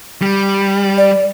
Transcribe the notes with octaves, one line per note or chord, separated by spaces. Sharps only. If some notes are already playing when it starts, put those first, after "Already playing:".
G3
D5